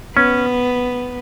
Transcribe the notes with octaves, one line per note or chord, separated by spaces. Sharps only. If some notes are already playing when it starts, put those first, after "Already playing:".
B3 C#4